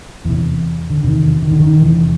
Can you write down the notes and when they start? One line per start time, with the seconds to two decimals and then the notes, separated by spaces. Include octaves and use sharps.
0.25 E2 C3 E3
0.90 D3
1.03 E2 C3 D#3
1.42 D#3
1.52 D3
1.60 D#3
1.81 E2 C3 E3